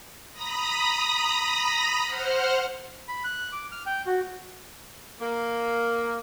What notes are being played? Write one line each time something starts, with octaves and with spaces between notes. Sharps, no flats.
A#5 B5 D#6 A#6
C5 F#5 F6
B5
F#6
D6
F6
G5
F#4
A#3